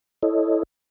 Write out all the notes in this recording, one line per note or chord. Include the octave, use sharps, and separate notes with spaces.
E4 A4 C#5 D#5